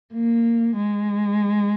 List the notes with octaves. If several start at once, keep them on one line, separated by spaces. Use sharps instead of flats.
A#3
G#3